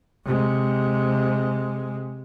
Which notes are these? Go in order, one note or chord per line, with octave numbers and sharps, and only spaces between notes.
C3 G#3